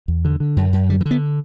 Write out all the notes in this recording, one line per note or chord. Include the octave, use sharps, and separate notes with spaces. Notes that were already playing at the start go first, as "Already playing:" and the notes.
E2
D3
D3
F#2
F#2
D3 G3
E3
D3
B3